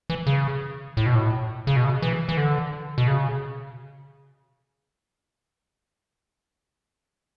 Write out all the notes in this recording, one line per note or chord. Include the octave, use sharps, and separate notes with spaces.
E3
C#3
A2
B2
A2
C#3
B2
C#3
E3
E3
D3
B2
C#3